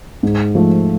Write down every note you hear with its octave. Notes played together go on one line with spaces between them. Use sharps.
G#2
F3 A3